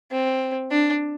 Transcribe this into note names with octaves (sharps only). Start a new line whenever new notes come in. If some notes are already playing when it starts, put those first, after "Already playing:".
C4
D4